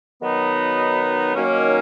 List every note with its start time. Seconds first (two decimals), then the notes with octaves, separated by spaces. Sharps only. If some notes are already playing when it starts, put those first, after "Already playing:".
0.21 D#3 F#3 B3 D#4
1.34 D#3 F#3 A#3 C#4